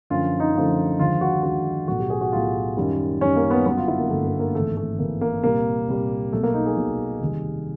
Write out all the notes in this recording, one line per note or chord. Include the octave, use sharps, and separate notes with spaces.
F#2 D3 F3 A3 F4
D#4
F#2 D3 F3 A3
D#2 D3 F3 G#3 F4
F#4
D#2 D3 F3 G#3 F#4
B1 A2 F#3 A3 F#4
G4
G#4
F#4
B1 A2 F#3 A3 F4
F#2 D#3 G3
F#2 D#3 G3 C#4
A#3
B3
G1 G2 D3 F#3 B3
F4
E4
A#3
G1 G2 D3 F#3 A3
A#3
A#3
G#1 G#2 E3 A3
A3
G#1 G#2 E3 A#3
A#3
C2 A#2 G3 A#3
C2 A#2 G3
B1 B2 F#3 A3
A#3
D#4
G#4
B1 B2 F#3 A3
F1 D#2 D#3 G3